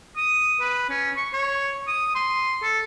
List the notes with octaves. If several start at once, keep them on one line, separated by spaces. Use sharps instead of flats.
D#6
B4
C#4
C#6
C#5
D#6
C6
A4